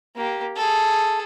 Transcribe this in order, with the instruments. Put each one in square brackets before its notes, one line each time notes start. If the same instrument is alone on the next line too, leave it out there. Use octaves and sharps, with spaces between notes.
[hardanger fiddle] A#3 G4
G#4 A4